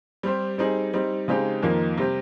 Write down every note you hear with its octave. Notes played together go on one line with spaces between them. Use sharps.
G3 C4 G4 C5
G3 C4 D#4 G#4
G3 C4 D#4
C#3 G#3 C4 D#4 G4
F2 D#3 A#3 F4 A#4
C3 G3 C4 G4